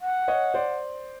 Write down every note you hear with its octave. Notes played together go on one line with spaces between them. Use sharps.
F#5
C#5 D#5
C5 D5